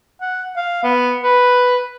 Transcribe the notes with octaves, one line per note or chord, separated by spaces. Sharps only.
F#5
F5
B3
B4